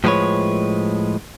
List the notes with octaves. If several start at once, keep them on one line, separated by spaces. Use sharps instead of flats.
A2 F3 G#3 G4 B4 C#5